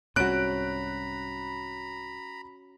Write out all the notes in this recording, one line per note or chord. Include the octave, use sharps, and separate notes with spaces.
C2 G#2 C#4 F#4 A#5 B5 F#6 D7